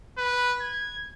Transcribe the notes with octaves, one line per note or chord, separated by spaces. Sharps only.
B4
G#6